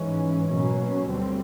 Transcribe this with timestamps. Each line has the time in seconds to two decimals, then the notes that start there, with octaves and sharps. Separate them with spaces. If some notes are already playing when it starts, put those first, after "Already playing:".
Already playing: G#2 E3 G#3 C#4
0.49 B2 F#3 A#3 C#4
1.09 D2 D3 G3 C4